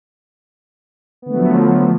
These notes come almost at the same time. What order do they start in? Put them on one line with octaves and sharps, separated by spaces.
B3 D3 A3 F#3 F3